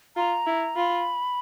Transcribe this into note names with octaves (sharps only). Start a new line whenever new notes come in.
F4 A#5
E4
F4 B5